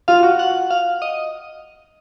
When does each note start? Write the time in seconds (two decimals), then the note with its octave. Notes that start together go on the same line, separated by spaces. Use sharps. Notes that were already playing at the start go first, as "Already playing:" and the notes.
0.08 F4 F5
0.23 F#4
0.39 F#5
0.71 F5
1.02 D#5